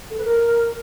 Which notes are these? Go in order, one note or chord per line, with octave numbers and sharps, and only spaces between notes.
A4
B4
A#4